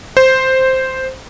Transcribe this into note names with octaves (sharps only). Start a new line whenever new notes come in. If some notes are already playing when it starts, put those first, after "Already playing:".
C5